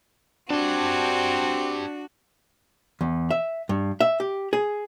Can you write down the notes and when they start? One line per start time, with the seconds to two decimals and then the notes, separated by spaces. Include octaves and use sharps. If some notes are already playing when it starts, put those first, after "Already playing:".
0.50 C4 D4 F#4 G4 A5
3.01 E2
3.30 E5
3.69 G2
4.00 E5
4.20 G4
4.53 G#4